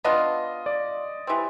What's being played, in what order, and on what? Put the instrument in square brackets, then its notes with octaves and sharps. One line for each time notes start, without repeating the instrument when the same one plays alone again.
[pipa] B3 D4 F4 [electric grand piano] D#5
[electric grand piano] D5
[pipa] E3 G3 C4